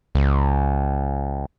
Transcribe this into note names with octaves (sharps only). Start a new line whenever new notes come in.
C#2